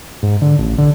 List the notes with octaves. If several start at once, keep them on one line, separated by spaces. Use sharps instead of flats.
G#2
D3
A1
D3